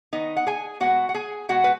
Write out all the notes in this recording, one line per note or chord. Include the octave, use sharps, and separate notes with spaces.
D#3 G#3 B3 D#4 D#5
F#5
G#4 G#5
B2 G#3 B3 F#4 F#5
F#5
G#4 G#5
B2 G#3 B3 F#4 F#5
B4